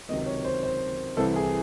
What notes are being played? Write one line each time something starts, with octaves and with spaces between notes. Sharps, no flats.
C#2 C3 D#3 F#3 D#5
C#5
C5
C5
C2 C3 E3 A4
G#4